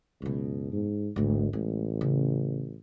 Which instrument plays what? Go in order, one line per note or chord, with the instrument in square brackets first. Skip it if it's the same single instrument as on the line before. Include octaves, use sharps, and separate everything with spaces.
[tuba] C#2 [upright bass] F#2 B2
[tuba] G#2
[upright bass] G#1 G#2 [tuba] D2
[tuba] A1 [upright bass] G#3
[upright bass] C#3